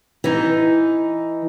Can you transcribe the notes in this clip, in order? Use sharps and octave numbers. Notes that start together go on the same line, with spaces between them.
E3 D#4